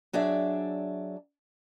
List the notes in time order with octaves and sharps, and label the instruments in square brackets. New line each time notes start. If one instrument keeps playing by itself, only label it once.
[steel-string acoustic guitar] F#3 D4 G#4 D5 E5